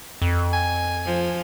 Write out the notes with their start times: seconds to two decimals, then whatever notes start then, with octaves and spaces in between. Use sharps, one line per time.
0.22 F2
0.53 G#5
1.05 F3